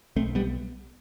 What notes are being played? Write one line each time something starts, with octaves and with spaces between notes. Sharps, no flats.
B1 A3 C4
G3 B3